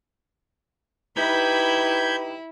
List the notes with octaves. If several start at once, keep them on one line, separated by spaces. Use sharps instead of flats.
D#4 E4 G4 B4 B5 G6 G#6